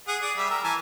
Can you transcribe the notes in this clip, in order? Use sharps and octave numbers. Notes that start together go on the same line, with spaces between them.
G#4 F#5
G#4 D5
G3 E5
A#4 E6
E3 G#5 A5